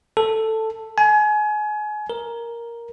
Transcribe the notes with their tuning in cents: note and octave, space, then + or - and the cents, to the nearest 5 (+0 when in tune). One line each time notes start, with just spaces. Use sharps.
A4 +5
G#5 +30
A#4 +5